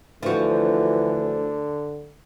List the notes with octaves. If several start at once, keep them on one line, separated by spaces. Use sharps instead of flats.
D2 D3 E3 F3 F#4